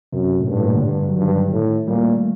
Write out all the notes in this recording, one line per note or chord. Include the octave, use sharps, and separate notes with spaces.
F#2 C3
A2
G2 A#2
A2
A#2
D3
G2
F#3
G2 D#3
A2
A#2 G3
A#3
A3